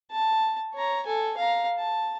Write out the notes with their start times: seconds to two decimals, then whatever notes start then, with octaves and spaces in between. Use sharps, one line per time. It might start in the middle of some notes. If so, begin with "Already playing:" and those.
0.11 A5
0.74 C#5 A#5
1.06 A4 G#5
1.37 F5 A#5
1.78 A5